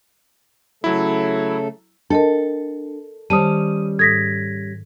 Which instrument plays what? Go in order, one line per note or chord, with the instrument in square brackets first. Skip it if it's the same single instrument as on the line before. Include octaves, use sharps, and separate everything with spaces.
[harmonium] C#3 A3 A4 [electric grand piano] F#3 E4
[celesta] D4 [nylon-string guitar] A4 [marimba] A#4 D#5 A5
[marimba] D#3 C5 A5 [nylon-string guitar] G3 C#4 [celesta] D#6 D#7
[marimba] G#2 A4 D#6 [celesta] G#6 A#6 B6